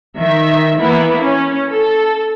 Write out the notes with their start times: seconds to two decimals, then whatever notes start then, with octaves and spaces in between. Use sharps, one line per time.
0.18 D#3 E5
0.80 E3 A#3 B3 E4
1.22 C#4
1.71 A4